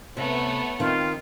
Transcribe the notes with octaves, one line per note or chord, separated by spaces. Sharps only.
C3 A3 B3 C#5
D#3 C4 F4